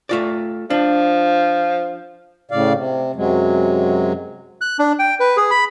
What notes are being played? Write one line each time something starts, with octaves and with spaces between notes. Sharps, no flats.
A3 F4 D5
F3 D4
A2 C#3 D5 F5
C3
F#2 C3 F#3 G#3
F#6
D4
G5
B4
G#4
B5